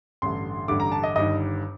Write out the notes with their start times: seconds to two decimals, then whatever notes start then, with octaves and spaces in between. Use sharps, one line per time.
0.22 A1 G2 D3 C6
0.68 A1 G2 D3 D6
0.80 A#5
0.92 A5
1.03 D#5
1.15 G1 G2 D#3 D#5